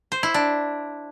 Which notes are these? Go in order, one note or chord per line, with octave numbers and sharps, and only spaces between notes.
C5
E4
D4